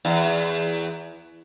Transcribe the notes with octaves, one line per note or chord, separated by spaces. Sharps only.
E2